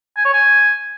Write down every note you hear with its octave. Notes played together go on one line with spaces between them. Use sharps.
G#5
C#5
G#5